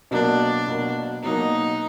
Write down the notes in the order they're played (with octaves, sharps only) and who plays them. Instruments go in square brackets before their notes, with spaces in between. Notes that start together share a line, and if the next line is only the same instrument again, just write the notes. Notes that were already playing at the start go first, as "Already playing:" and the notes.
[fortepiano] B2 F#3 A#3 [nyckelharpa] D4
[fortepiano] B2 F#3 A#3
[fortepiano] B2 F#3 A#3 [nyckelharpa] D#4